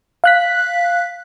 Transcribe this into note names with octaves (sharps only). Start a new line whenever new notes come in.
F5 F#6 B6